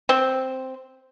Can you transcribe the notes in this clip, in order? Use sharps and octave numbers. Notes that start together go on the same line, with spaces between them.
C4